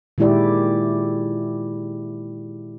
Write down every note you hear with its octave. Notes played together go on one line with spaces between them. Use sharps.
A#2 D#3 G#3 E4 G4 D5